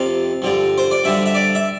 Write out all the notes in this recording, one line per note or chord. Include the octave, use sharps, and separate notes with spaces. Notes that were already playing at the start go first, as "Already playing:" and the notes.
Already playing: F2 C3 F3 F5
G2 D3 F3
C5
D5
G2 D3 F3 E5
E5
D5
E5